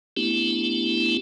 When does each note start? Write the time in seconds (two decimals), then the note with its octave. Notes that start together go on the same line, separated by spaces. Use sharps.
0.17 A3 B3 C4 D4 E4 G4